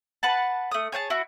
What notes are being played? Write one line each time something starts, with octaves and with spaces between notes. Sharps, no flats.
B4 F#5 A5
A3 D#6
G#4 C#5 G5 A5
E4 F#4